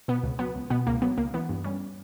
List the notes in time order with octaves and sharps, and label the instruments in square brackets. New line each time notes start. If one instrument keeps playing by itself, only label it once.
[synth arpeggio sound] B2 B3
C#2
F#3 B3
C#2
B2 B3
C#2 A#3
F#3 B3
C#2 A#3
E3 B3
G2
G3 C#4